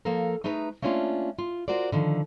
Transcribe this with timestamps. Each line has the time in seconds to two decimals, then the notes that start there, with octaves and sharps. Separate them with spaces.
0.05 F3 A#3 A4 A#4
0.44 A3 D#4 G#4 B4 A#5
0.82 A3 A#3 C#4 D4 F4
1.39 F4
1.68 F4 F#4 A#4 C5 D5
1.92 D3 D#3 F3